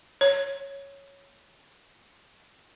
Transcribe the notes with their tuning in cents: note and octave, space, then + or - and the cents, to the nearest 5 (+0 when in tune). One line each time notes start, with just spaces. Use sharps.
C#5 +0